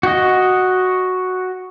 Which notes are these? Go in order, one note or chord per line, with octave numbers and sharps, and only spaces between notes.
F#4 D#5